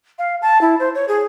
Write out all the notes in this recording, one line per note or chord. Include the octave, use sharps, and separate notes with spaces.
F5
A5
E4
C5
C#5
G#4